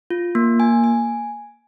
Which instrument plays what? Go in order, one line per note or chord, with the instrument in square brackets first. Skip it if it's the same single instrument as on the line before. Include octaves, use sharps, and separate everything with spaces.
[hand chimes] F4
A#3
G#5
G#5